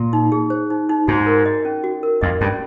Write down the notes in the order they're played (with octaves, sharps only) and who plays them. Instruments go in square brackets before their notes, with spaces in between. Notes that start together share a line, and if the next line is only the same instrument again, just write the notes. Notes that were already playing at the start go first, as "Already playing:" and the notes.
Already playing: [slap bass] A#2
[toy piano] D#4
G#4
C5
D#4
D#4
[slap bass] G#2 [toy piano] F#4
[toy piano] A#4
D#5
C#4
F#4
A#4
[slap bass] F2 [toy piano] D#5
[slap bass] G2 [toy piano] C#4